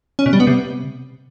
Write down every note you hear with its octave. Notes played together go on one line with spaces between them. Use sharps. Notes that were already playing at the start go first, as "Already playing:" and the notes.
C#4
B2
G3
B3
C3